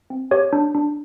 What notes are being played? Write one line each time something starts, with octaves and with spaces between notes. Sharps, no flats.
C4
G4 C#5
D4
D4